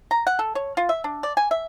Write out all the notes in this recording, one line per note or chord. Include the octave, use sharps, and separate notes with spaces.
A#5
F#5
A4
C#5
F4
E5
D4
D5
G#5
E5